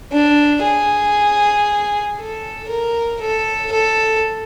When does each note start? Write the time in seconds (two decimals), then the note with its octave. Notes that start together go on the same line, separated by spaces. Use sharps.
0.12 D4
0.63 G#4
2.18 A4
2.69 A#4
3.21 A4
3.72 A4